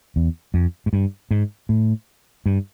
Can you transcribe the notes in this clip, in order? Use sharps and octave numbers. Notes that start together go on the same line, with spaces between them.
E2
F2
G#2
G2
G#2
A2
G2